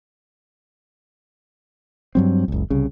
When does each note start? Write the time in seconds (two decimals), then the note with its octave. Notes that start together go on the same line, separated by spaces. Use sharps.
2.15 G2 F#3 C4
2.48 F#1 C#2
2.70 C2 C#3